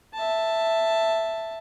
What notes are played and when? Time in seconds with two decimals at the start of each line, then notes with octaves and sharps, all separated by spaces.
0.14 E5 A5